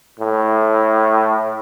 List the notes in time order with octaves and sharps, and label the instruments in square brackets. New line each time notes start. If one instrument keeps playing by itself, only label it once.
[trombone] A2